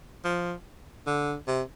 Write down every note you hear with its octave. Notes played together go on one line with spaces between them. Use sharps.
F3
D3
C3